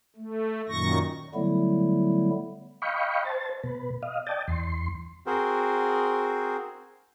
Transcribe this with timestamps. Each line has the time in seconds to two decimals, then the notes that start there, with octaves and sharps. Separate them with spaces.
0.16 A3
0.69 F#2 A#2 D#3 C#6 A#6
1.34 D3 F#3 G3 A3 B3 E4
2.82 D#5 F5 G5 B5 C#6
3.24 C5 A5
3.63 B2 B4
4.03 D#5 F5
4.27 D5 D#5 G5 A5
4.48 E2 C6
5.27 C4 F#4 G#4 A#4 C5